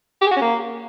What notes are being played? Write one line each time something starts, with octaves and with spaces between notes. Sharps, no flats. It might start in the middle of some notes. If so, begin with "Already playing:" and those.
G4
G#4
F#4
C#4
A#3